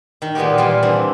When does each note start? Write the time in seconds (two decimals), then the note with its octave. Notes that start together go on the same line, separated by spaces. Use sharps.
0.22 D#3
0.35 A#2 G#3 B3 D#4 F#4 G4
0.58 A#2 E3 G3 F4
0.83 D3 E3 C4 D4